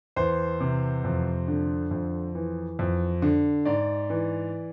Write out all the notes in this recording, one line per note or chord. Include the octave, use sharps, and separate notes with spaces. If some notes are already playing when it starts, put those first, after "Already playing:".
E2 C5
C3
F2
D3
F2
E3
F2
D3
G#2 D5
E3